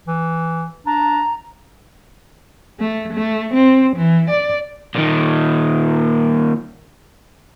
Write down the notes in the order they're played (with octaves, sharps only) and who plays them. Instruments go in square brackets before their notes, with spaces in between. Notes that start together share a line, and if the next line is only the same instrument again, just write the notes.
[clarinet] E3
[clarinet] D4 [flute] A#5
[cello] A3
A3
C4
E3
D5
[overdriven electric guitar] A#2 D#3